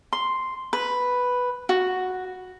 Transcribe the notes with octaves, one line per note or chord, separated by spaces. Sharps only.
C6
B4
F#4